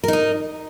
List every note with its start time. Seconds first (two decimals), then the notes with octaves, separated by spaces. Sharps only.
0.04 A#4
0.08 D#4
0.13 D#5